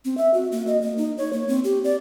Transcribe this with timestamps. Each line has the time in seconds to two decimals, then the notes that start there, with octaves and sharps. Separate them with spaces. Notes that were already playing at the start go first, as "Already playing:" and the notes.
0.05 C4
0.17 E5
0.34 F#4
0.52 A#3
0.67 D#5
0.82 A#3
0.98 D#4
1.18 C#5
1.33 A#3
1.48 C4
1.64 G4
1.84 D5